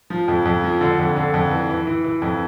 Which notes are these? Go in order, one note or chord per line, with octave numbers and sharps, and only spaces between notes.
F3
F2
F2
F3
D3
F2
D3
F2
E3
E3
E3
E3
F2